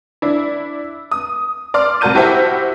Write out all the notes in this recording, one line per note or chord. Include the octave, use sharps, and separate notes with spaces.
D4 E4
D#6
D5 C6 D6 F6
C2 F#4 A#4 A5 G6 D#7
E4 F#4 G4 C5 E5 F#5